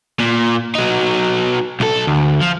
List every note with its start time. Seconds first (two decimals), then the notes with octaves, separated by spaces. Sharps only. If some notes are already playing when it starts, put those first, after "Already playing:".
0.20 A#2
0.75 F#3 D#4
1.80 B1 A4
2.07 D2
2.41 F3